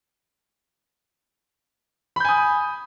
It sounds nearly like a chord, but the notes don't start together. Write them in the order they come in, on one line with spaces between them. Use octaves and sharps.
B5 G6 G#5 D#6